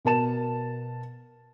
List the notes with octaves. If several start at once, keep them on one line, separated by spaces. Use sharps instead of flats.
B2 A#4 A5 E7